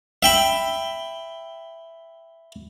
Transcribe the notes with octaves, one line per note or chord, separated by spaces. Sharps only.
E5 G5 B5